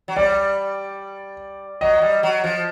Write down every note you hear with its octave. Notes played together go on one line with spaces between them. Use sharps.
F#3
G3 D5
F#3 D#5
G3
F#3
F3